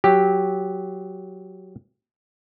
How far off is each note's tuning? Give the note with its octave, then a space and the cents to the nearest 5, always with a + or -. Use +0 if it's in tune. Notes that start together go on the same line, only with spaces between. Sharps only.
F#3 +0 G4 +0